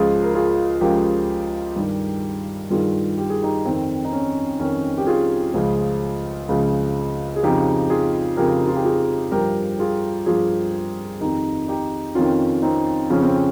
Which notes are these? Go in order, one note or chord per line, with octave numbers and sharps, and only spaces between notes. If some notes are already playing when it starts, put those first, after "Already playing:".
Already playing: C#2 C#3 F3 F4 G#4
A#4
F4 G#4
C#2 C#3 F3 G4 A#4
G2 D#3
G2 D#3 F4 G#4
G4
G#4
D#4 G4
F2 D#3 C4
D#4
C#4
F2 D#3 C#4
G4
F4 G#4
C#2 C#3 F3
C#2 C#3 F3
G#4
F2 C#3 F3 D#4 G4
F4 G#4
F2 C#3 F3 G4 A#4
D#4
F4
G4
F4 G#4
G2 F3 G4 A#4
F4 G#4
G2 F3 F4 G#4
F2 D#3 D#4 G4
D#4 G4
F2 D#3 C#4 F4
C4 D#4
F2 C#3 F3 C#4
C4
C#4